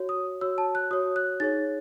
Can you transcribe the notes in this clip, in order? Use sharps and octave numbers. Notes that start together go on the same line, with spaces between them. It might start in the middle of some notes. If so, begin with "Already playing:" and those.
Already playing: F#4 C#5
D#6
F#4 C#5 E6
A5
F#6
F#4 C#5 D#6
F#6
D#4 G#4 C#5 A6